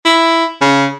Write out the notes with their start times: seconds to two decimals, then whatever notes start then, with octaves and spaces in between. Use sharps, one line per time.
0.05 E4
0.61 C#3